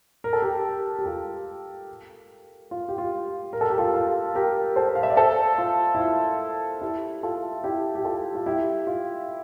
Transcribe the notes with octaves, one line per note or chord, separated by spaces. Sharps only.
A#4
A4
G4 A#4
G4
F4 A4
F4
G4
F4
A#4
A4
G4
F4 A4
F4 A4
G4 A#4
A4 C5
F5
E5
D5
A4 C5
F4
E4
F4
E4 G4
F4 A4
E4 G4
G4
F4 A4
F4
E4 G4
F4